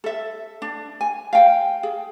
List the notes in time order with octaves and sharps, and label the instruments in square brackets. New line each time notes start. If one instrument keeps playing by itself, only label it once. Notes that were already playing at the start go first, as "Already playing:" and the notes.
[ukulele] A4 E5
D4
G#5
F5 G5
G#4